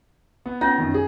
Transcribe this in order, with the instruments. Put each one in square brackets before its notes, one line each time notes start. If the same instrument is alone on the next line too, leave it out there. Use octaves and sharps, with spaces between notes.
[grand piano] B3
[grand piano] B3 A#6 [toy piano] C#4 F4 C#5
[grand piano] F#2 D#3
G#4